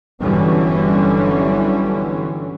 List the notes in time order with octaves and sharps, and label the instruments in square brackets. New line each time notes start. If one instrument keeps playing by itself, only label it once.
[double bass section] G1 D3 E3 F#3 G3 C#4